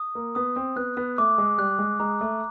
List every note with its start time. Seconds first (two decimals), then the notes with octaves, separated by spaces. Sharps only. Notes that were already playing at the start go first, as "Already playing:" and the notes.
Already playing: D#6
0.15 A#3
0.35 B3 D#6
0.56 C4
0.76 B3 F#6
0.97 B3
1.18 A3 D6
1.38 G#3
1.58 G3 F#6
1.79 G#3
2.00 G#3 A#5
2.21 A3